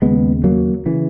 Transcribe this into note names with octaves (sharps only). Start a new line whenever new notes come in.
D#2 C#3 G#3 B3
F#3 A#3
C#3 E3